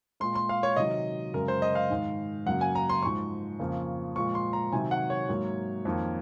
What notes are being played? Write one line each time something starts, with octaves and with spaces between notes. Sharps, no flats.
A#2 G#3 C6
C6
F5
C#5
C3 D#3 F#3 D#5
F#2 C#3 G#3 A#4
C5
D#5
F5
G#2 D#3 G#3
F#2 C#3 F#3 A#3 F#5
G#5
A#5
C6
G#2 F3 G#3 C#6
F2 C#3 F3 A#3
A#2 F3 G#3 C#6
C6
A#5
C3 D#3 F#3 G#5
F#5
C#5
G#2 F#3 A#3
F2 D#3 A#3